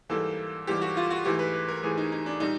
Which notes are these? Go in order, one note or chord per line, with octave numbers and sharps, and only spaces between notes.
G#2 E3 G3 A#3 A4
G#2 E3 G3 A#3 G4
F#4
F4
F#4
G#2 E3 A3 G4
B4
B4
A#4
G#2 E3 A3 G#4
D#4
D#4
D4
A#2 G3 D#4